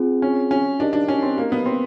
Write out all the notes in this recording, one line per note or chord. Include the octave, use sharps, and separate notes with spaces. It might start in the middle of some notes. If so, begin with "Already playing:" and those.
Already playing: C4 F4 G#4
C#4
C#4
D4 D#4 G4 A#4 D#5
D4
C#4
C4
A#3
B3
C4